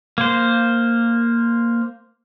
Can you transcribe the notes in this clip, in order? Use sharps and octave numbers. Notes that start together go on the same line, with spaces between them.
A#3 C5